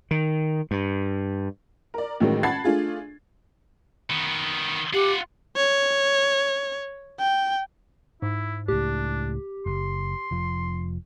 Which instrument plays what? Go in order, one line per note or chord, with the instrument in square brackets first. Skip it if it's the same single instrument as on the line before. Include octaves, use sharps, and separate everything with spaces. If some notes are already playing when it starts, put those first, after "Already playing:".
[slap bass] D#3
G2
[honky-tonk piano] A#4 D5
A1 A2 D#3 F#3 G#3
F#5 A5 B5 G#6 A6 C7
A3 D4 F4 G#4
[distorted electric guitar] D#3 B3
[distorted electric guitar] F4 F#5 [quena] G4
[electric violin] C#5
G5
[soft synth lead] G#2 [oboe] E4
[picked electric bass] C#2 A2 [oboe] D4 [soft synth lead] G4
[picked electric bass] F#1 [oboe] C6
[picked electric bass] F1 F3